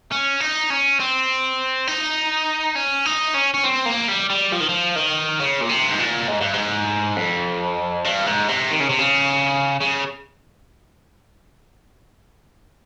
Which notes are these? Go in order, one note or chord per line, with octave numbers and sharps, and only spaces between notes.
C#4
D#4
C#4
C4
D#4
C#4
D#4
C#4
C#4
C4
A#3
G3
G3
F3
D#3
F3
D#3
C#3
A#2
C3
G2
G#2
A#2
G#2
G2
G#2
F2
G2
G#2
C3
D#3
C#3
C3
C#3
C#3